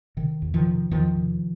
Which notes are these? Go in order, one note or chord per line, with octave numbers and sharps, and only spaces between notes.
C3 D#3
E2
D#3 F3
C3
E2 D#3 F3
C3